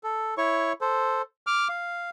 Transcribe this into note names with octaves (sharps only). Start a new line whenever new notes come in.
A4
E4 C#5 C#6
A4 C5
D6 F6
F5